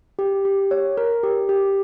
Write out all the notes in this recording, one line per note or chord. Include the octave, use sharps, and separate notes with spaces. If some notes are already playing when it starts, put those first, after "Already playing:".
G4
G4
C#5
A#4
G4
G4